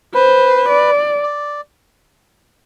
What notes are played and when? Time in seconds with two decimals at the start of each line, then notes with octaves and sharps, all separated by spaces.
0.15 B4 C5
0.69 D5
1.23 D5